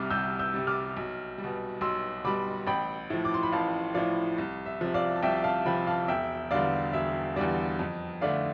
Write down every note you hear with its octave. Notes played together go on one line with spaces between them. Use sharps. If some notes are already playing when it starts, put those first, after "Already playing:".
Already playing: C2 C3 G3 D6 F6
C2 E6 G6
E6 G6
C3 G3
D6 F6
B1
G3
B2
B1 C6 E6
B2 G3 B5 D6
A1 G5 B5
A2 F3
D6
C6
B5
A1 F5 A5
A2 F3 D5 F5
C2
E5
C3 F3
D5 F5
A5
C2 E5 G5
F5 A5
C3 F3 G5 B5
F5 A5
E1 E5 G5
E2 D3 G3 D5 F5
E1 E5
E2 D3 G3 D5
F2
D3 A3 D5 F5